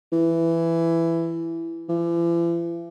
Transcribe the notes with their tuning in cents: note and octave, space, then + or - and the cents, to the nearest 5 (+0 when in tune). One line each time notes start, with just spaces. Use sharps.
E3 +10
E3 +45